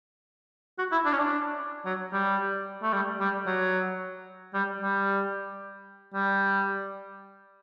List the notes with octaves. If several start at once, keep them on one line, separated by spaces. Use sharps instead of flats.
F#4
E4
D4
C#4
D4
F#3
G3
A3
G3
G3
F#3
G3
G3
G3